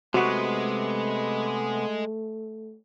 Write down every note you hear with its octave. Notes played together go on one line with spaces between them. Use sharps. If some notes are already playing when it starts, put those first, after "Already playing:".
C3 G#3 A3 B3 F#4 F#5